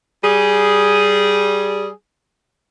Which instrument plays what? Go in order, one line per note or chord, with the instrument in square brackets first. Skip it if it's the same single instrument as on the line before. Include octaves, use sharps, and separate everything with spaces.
[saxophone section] G3 G#4